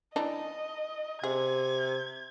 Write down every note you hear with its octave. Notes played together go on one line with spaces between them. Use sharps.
E3 D4 D#4 D#5
C3 G#4 G#6